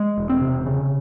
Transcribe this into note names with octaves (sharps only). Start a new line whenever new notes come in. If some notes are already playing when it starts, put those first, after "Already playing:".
Already playing: G#3
E1
C4
C3
C#3